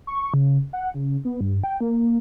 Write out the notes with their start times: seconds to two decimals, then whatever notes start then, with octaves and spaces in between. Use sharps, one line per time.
0.07 C#6
0.34 C#3
0.73 F#5
0.94 C#3
1.25 B3
1.41 G2
1.64 G5
1.81 A#3